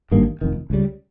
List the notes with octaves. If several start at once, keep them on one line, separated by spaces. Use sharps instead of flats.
G#1 G2 D#3 A#3
F1 F2 D#3
C#2 C#3 G3